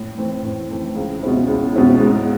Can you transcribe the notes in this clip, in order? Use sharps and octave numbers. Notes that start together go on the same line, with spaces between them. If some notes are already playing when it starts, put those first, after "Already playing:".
Already playing: A2
E3 A3 C4
A2
E3 A3 C4
C#2
B2 G#3 C#4 E4
C#2
B2 G#3 C#4 E4
G#2